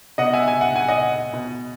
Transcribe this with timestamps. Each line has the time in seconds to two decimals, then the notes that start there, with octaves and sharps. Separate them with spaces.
0.18 B2 D#5 F#5
0.33 E5 G#5
0.47 E5 G#5
0.61 F#5
0.76 G#5
0.88 D#5 F#5
1.33 B2